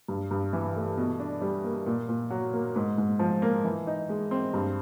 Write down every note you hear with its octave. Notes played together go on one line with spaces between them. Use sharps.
G2
G2
E3
A3
B2
D4
G3
A#3
A#2
A#2
F#3
A#3
G#2
G#2
F3
A#3
E3
D#4
G#3
C4
G2